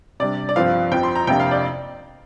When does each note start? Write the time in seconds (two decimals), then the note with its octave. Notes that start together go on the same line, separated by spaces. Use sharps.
0.20 C3 G3 D4 D5
0.49 D5
0.56 G2 F3 C4 F5
0.91 F2 F3 C4 G5
1.03 C6
1.15 A#5
1.27 F2 C3 A#3 D4 G5
1.40 F5
1.51 D5